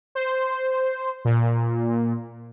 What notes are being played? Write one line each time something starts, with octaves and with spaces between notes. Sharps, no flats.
C5
A#2